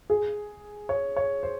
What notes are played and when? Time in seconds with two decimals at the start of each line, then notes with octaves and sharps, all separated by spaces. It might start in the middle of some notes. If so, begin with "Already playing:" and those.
0.10 G#4
0.89 C#5
1.16 C#5
1.43 C5